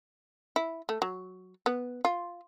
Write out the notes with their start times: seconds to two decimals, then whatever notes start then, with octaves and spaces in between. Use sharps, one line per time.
0.56 E4
0.89 A3
1.02 F#3
1.66 B3
2.05 F4